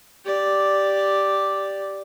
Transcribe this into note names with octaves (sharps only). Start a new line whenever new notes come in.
G4 D5